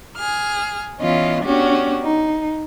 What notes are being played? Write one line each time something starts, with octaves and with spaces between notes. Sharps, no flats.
G#4 F6
E3 B3 C#4 F4 D#5
B3 C#4 D4 F#4 G4
D#4